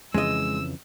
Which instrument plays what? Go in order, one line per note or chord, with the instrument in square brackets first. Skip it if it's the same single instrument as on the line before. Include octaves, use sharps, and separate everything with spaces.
[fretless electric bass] F2 C#3 E3 [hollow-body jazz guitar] G#3 D#5 [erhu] E6